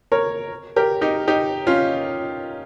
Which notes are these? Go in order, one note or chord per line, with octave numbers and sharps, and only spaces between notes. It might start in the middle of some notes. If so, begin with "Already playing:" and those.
A#4 C#5
G4 A#4
D#4 G4
D#4 G4
C#4 F4